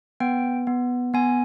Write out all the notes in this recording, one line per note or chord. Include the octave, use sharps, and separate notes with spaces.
B3 G5
B3
B3 G#5